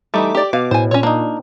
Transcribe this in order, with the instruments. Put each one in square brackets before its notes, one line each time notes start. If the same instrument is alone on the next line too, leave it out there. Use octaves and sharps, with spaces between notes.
[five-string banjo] E3 G3 [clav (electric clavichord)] A3 D#4 [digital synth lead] D6
[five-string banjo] G4 D5
[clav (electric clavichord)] B2 [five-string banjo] F5
[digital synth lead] A2 [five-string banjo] C5 G#5
[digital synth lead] A#2 [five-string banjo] C#4 C#5
[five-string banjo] A#3 [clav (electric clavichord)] D4 D#4